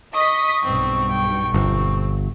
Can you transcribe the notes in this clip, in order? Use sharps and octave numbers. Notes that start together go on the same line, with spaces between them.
D#5 C#6 D#6 B6
B1 G2 C4
G5
G1 C4